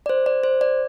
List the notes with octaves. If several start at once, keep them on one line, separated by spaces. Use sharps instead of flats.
D5
C5
D5
C5
D5